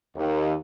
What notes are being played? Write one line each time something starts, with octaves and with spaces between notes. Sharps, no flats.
D#2